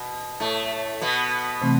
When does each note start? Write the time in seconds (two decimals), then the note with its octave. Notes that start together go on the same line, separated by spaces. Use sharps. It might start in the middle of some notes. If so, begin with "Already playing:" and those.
Already playing: B2
0.40 A2 A3
1.02 B2 B3
1.62 C3 E3 A3 C4